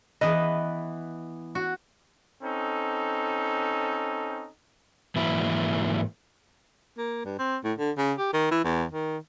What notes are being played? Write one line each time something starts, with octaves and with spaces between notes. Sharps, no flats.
E3 B3 B4 D#5
F#4
C4 C#4 D#4 A4
G#2 E3 F#3 A#3 E4 E5
A#3
G2
C4
A2
D3
C#3
G4
D#3
E3
E2
D#3